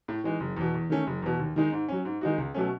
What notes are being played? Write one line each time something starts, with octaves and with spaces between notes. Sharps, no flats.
A2
E3 G#3 D#4
F#1
E2 B2
E2
D#3 A3 C#4
F#1
E2 B2
D#2
D#3 G#3 D#4
G#2
F#3 C#4
G#2
D#3 G#3 D#4 F#4
C#2
B2 F#3 A3 C#4